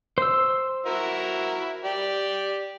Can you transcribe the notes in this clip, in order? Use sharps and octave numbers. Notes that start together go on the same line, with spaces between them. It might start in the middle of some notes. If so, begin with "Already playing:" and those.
C5 E6
E4 F#4 A#4
G4 D5 G5